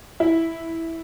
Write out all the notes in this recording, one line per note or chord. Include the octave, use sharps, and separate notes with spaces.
E4